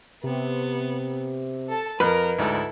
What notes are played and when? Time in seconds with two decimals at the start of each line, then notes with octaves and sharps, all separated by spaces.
0.24 C3 B3
1.69 A4 A5
2.00 F2 A#4 B4
2.39 D2 G#2 E4 A4